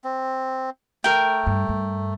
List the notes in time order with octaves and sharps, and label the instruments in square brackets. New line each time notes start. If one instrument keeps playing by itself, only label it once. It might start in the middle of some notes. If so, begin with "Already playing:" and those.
[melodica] C4
[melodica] A3 [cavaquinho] A#4 G5
[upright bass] G2
G2